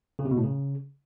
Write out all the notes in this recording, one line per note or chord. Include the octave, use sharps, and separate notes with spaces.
C#3
C3
B2
A2
C#3